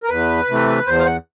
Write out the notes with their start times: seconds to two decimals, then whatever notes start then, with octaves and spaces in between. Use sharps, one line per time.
0.03 A#4
0.09 E2 B4
0.49 C3 E3 A3
0.87 E2 C5
0.99 F5
1.06 F#5